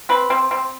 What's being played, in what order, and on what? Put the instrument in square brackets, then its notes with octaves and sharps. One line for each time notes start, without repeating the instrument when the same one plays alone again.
[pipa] C4 B4
C4
C4